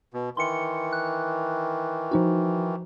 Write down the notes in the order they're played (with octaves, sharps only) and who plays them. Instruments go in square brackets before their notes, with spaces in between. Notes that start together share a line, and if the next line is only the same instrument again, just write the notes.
[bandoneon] B2
[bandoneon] D#3 E3 [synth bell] C6 C#7
[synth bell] F#6
F3 D#4 F#4